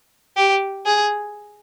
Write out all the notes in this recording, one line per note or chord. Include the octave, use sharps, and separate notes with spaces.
G4
G#4